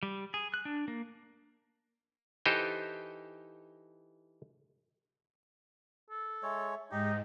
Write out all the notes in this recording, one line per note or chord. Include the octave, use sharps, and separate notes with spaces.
G3
G#4
F#6
D4
A#3
E3 D#4 G4 A4 C5 D#5
A4
G#3 C#5 E5
G#2 D#4 G4 D#5